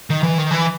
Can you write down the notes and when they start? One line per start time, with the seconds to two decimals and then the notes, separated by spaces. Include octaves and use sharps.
0.10 D#3
0.23 E3
0.38 D#3
0.51 E3